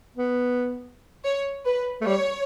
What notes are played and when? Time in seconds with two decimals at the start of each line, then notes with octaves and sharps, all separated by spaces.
0.17 B3
1.25 C#5
1.65 B4
2.01 A3
2.05 G3 C#5